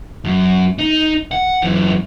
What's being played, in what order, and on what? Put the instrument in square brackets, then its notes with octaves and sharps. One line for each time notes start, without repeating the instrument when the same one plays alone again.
[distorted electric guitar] F#2
D#4
F#5
F#2 E3